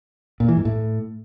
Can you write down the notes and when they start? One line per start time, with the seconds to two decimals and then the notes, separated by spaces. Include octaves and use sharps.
0.40 A#2
0.48 E3
0.57 G#2
0.65 A2